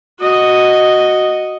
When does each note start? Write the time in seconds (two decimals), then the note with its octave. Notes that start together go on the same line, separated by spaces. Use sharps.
0.20 F#4 D#5